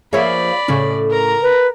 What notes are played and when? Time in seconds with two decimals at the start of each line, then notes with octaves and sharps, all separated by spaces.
0.13 F3 A#3 G#4 C#5 D5 E5 B5
0.68 A2 C#3 C#4
1.10 A#4 A#5
1.42 B4